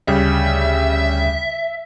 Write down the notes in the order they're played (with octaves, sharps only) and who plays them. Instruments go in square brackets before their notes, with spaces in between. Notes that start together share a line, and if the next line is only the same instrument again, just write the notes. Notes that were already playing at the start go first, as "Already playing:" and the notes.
[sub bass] D2 [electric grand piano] C#3 G3 [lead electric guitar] E5